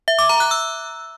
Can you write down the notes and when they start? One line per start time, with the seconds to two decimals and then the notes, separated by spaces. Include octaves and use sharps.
0.08 E5
0.19 D6
0.29 A#5
0.40 F#6
0.51 E6